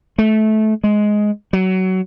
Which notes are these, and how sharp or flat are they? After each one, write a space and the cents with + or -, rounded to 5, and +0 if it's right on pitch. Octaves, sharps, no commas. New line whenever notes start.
A3 -20
G#3 +10
F#3 +20